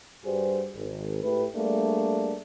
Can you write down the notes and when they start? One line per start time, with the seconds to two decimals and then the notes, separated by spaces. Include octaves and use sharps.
0.25 G2 G3 F#4 G#4 C5
0.76 G#1
1.24 A2 A3 G4 B4
1.56 G3 A3 A#3 D4 G#4